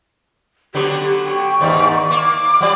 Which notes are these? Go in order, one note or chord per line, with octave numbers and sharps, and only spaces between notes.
D3 F#3 B3 G4
G5 C#6
D#2 G#2 D#4 D5
A#3 D6
F3 G3 D5